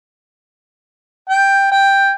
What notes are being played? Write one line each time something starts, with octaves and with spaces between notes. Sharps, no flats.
G5
G5